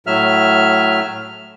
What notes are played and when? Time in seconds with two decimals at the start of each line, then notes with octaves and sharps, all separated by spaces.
0.07 A2 F#3 E5 F6